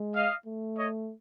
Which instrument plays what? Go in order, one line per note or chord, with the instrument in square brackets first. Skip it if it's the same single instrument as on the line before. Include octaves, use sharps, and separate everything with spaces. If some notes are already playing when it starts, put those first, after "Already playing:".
Already playing: [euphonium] G#3
[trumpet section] D#5 F5
[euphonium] A3
[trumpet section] C#5 D#5